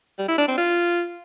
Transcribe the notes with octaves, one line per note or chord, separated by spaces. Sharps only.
G3
E4
D4
C4
F4